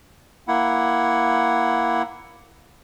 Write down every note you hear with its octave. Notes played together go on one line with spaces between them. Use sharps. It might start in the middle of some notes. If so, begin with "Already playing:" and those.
A#3 E4 F#5